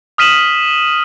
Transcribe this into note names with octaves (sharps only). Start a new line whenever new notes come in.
D#6 F6 B6 D#7 E7 F#7